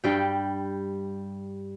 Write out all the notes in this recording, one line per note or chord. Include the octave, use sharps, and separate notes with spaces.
G2 G3 G5